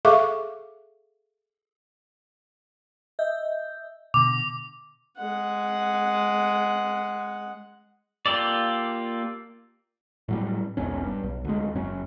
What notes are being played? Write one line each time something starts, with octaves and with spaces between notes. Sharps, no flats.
G#4 A4 E5 F5 C#6 D6
D#5 E5 G6
B2 D3 D6
G#3 F#5
A#3 F4 G4 A4 D5
A2 F#3 G3
E1 B1 C#4
G2
B1
D2 G#3
F#1 F#2 C#4